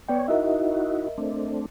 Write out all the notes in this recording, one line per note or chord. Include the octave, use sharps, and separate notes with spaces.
B3 C#5 D5 G5
D#4 E4 F#4 A#4 D#5 E5
A3 C4 D4